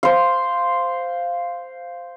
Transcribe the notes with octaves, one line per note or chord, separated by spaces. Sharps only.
C5 F5